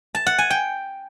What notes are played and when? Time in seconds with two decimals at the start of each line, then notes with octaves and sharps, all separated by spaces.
0.15 A5
0.27 F#5
0.38 G#5
0.50 G5